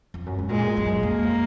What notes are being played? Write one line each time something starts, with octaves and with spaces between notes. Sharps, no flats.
F2
F#2
G#2
A#2 G#3
F#2
F2 A#3